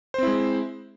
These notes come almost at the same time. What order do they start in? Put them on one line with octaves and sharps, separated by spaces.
C5 C4 E4 G#3